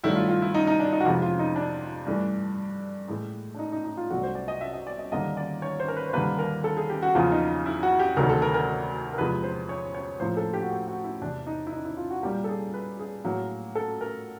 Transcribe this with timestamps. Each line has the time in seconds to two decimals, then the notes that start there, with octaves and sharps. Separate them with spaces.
0.04 G2 D#3 F#3 A3 E4
0.16 F4
0.29 F4
0.42 E4
0.54 D#4
0.67 D#4
0.80 D4
0.93 D#4
1.00 F#4
1.05 F2 C3 E3 G#3 F4
1.22 F4
1.39 D#4
1.56 D4
2.07 G2 E3 A3
3.08 A2 E3 G#3
3.54 D4
3.59 D#4
3.72 D#4
3.85 D#4
3.97 F4
4.10 C2 B2 F#3 A3 F#4
4.23 C5
4.35 D5
4.48 D#5
4.61 E5
4.73 D#5
4.87 D5
4.99 D#5
5.12 D#2 D3 G3 A#3 D#5
5.37 D5
5.62 C#5
5.80 C5
5.88 A#4
5.96 B4
6.09 C5
6.13 D#2 D3 G3 A#3 B4
6.39 A#4
6.64 A4
6.77 G#4
6.89 G4
7.02 F#4
7.15 E2 C#3 F3 A#3 F4
7.32 D#4
7.66 E4
7.83 F#4
7.99 G4
8.17 D2 C3 D#3 F#3 A3 A#4
8.29 A4
8.42 A#4
8.54 A#4
9.13 A#4
9.18 E2 C3 F3 G#3 B4
9.44 C5
9.69 C#5
9.95 C#5
10.20 A2 F3 A#3 C5
10.37 A4
10.53 G4
10.62 F#4
10.71 G4
10.88 F#4
11.04 E4
11.21 E2 C3 E3 D4
11.47 D#4
11.67 E4
11.72 D#4
11.85 E4
11.97 F4
12.10 F#4
12.23 A#2 G3 A#3 G4
12.44 A4
12.49 G#4
12.74 B4
12.99 G#4
13.24 A2 F#3 A#3
13.75 A4
14.01 A#4